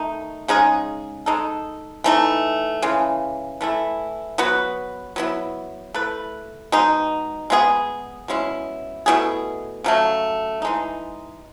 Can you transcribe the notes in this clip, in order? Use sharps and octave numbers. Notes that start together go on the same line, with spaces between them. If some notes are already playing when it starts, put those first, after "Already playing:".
Already playing: D#3 A3 D#4
C#3 G#3 D#4 G#4
G#3 D#4 A4
E3 A3 D#4
C#3 E3 G#3
E3 A3 E4
F#3 B3 F#4 B4
F#3 B3 E4
A3 E4 B4
B2 G#3 D#4
G#3 B3 E4 G#4
B2 G#3 C#4 E4
B2 A3 E4 G#4
C#3 F#3 A3
E3 G#3 D#4